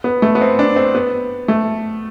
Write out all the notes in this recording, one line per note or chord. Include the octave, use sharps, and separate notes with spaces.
B3
A3
B3
C4
D4
C4
B3
A3